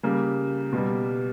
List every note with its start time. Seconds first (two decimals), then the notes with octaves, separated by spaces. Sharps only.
0.03 C#3 G3 A#3
0.73 B2 G3